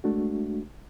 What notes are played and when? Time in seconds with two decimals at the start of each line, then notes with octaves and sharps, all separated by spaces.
0.04 G#3 A3 D4 F#4